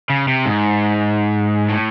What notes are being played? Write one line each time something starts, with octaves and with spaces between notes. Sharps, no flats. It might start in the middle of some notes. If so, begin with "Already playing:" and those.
C#3
C3
G#2
A2